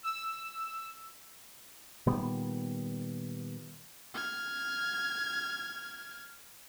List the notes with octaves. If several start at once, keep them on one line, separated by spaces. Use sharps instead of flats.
E6
A#2 D#3 G3 B3
F6 G#6